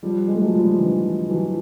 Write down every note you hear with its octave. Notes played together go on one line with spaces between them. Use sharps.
F3 G3
G#3
A3
F#3 G#3
F3 G3
D3 E3
E3 F#3